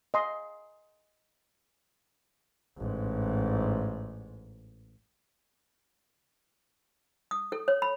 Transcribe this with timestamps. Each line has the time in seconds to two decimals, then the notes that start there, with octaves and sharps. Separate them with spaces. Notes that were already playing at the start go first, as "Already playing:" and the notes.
0.14 D#5 G#5 C6
2.77 A1 G#2
7.31 D#6
7.52 A4
7.68 C#5
7.82 B5